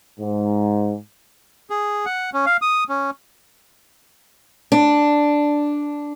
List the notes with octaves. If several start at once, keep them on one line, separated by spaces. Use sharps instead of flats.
G#2
G#4
F#5
C#4
F5
D#6
C#4
D4